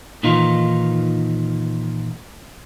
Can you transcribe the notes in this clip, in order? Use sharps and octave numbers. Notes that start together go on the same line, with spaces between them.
A#2 D#3 E3 D#4 F4